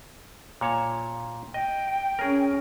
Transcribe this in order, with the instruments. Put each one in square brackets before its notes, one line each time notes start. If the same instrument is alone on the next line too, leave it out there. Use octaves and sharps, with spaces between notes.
[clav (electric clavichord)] A#2 C#5 A5
[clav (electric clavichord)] D#5 [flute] G5
[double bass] C#4 [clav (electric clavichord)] G#4 A#4